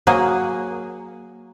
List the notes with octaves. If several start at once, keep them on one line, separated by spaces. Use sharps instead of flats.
F#3 A#3 G#4